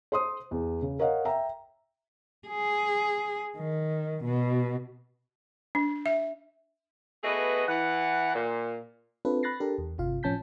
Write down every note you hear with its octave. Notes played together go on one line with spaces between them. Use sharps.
C5 C6 D#6
E2
C#3
A#4 C#5 D#5 F5 F#5
E5 G5 A#5
G#4
D#3
B2
D4
E5
A3 B3 F#4 G#4 B4 D#5
E3 F#5
A#2
C4 D4 F4 A4 B4
B5 F#6 A6 A#6 C7
D4 G4 A4 A#4
E2
G1 C3 F4 F5
A2 F3 C#4 A5 G6 B6